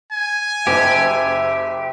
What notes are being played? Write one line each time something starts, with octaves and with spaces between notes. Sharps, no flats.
G#5
F#1 G4 E5